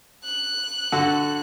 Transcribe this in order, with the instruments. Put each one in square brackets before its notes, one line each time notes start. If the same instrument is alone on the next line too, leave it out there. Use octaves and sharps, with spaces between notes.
[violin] F#6
[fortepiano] D3 F#4 A4